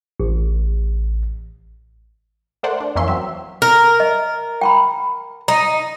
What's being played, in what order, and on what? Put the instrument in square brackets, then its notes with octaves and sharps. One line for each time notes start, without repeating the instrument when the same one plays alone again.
[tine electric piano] A1
[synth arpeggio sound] A3 A#4 C5 D5 F#5
D4
F2 E3 A#3 C#4 E5 C6
F#3 C4 E5
[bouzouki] A#4
[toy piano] D#5
G5 A#5 B5
[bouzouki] D#4 [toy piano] A#5